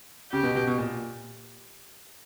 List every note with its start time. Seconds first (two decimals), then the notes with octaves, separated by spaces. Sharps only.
0.32 C#3 G4
0.43 B2
0.55 B2
0.67 B2
0.78 A#2